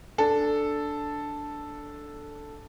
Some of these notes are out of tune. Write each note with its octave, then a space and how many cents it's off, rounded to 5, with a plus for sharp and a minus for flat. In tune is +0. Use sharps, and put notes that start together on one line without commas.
D4 +0 A4 +0